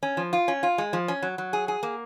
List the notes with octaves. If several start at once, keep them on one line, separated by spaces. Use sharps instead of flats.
C#4
F3
F4
C#4
F4
G#3
F3
C#4
F#3
F#3
G#4
G#4
A#3